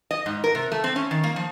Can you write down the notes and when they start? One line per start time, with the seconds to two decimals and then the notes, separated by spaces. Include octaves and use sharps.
0.11 D#5
0.26 G#2
0.44 A#4
0.55 C3
0.72 A3
0.84 C4
0.96 C#4
1.11 D#3
1.24 A#3
1.36 F3